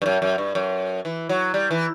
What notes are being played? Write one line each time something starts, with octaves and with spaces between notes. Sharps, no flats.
G2
F#2
F#2
G2
F#2
E3
F#3
G3
E3